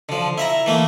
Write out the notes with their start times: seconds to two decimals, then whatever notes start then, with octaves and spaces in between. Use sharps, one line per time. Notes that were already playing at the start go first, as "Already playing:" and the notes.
0.09 D3 F3
0.38 E4 E5 A#5
0.66 E3 A3 A#3